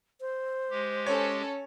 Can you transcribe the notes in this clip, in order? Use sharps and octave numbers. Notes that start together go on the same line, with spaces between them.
C5
G#3 G4
C#4 A4 C#5